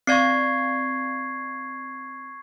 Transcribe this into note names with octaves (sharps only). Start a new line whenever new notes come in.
C4 D5 F5 C#6 G#6 C7